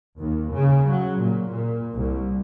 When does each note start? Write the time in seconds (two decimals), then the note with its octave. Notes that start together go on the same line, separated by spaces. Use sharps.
0.19 D#2
0.53 C#3
0.88 F#3
1.20 A#2
1.52 A#2
1.93 C2